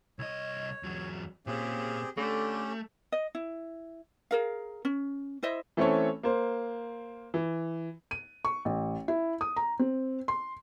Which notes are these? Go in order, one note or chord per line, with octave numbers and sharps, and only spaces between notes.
C2 C#5 D#5
E2 F#3
A#2 C#3 A#3 C4 G4 G#4
D3 A3 C#4 G4
D#5
E4
G#4 A#4 F5
C#4
E4 C5 D#5 E5
E3 A3 C4 C#4 A4 C#5
A#3 C5
E3
D#7
C#6
A1
E4
D#6
A#5
C4
C6